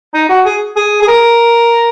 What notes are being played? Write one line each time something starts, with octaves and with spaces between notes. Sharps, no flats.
D#4
F#4
G#4
G#4
G#4
A#4